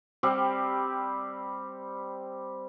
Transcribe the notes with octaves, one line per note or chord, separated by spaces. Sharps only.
G3 C4 G4